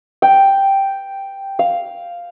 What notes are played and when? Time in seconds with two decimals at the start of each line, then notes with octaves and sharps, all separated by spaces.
0.22 G5
1.59 F5